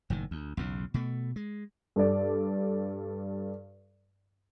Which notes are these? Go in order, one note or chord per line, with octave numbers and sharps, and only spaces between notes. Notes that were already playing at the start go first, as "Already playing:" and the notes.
F#1 A2 D#3
D2
B1 E2 C#3
B2 A3
G#3
G2 A4 D5